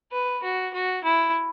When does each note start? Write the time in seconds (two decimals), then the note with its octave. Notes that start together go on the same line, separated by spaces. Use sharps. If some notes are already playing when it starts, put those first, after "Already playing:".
0.12 B4
0.43 F#4
0.73 F#4
1.04 E4